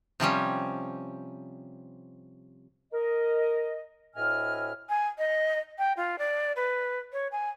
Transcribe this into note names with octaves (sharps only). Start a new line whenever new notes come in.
C3 F3 G3 C#4
A#4 D#5
D2 A2 D#5 E5 G#5 F6
G#5
D#5
G5
F4
D5
B4
C#5
G#5